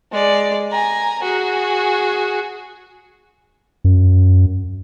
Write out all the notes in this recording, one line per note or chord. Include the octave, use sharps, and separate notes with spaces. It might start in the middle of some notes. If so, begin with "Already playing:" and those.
G#3 D5
G#5 A#5
F#4 G#4
F#2